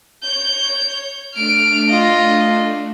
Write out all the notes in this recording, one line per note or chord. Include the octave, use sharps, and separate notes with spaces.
C#5 G6
A3 D4 F6 D7
F4 D#5